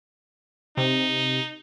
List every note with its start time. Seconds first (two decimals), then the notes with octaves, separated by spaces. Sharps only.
0.77 C3 D#4